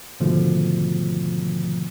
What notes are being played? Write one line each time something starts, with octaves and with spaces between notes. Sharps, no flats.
G#2 B2 D3 D#3 F3 A3